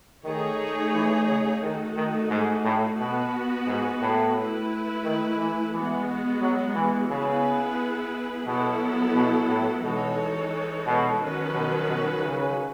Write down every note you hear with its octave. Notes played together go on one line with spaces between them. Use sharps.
D#3 A3 D#4 G#4 C#5
E3
C#3
D#3 A3 D#4 F#4 A4
D#3
G#2
A2
B2 B3 F#4 B4
G#2
A2
A3 E4 B4
D#3
E3
E3 G#3 B3 F#4
F#3
E3
C#3 B3 E4 G#4 B4
B2 F#3 B3 E4 A4
B2
A2
B2 E3 G#3 D#4 A4 C#5
B2
D#3 F#3 C#4 F#4 B4
B2
B2
C#3